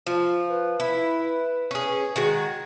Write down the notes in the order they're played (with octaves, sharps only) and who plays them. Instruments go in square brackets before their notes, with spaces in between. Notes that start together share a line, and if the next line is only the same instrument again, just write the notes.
[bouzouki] F3 [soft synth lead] F4
[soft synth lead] B4
[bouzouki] E4
C#4 G#4
D#3 G#3 F#4